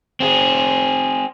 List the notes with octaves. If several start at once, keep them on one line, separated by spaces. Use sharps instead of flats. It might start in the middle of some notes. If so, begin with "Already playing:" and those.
C4 G#4